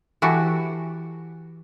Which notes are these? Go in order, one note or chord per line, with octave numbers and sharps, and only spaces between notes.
E3 F#4 G4 A4